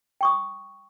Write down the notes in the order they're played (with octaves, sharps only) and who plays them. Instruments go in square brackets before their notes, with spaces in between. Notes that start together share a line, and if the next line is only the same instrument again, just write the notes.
[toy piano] G5 C#6 D#6